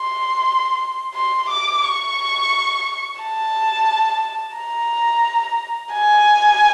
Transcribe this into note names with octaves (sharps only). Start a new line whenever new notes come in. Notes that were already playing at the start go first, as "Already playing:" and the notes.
Already playing: C6
C6
D6
C#6
A5
A#5
G#5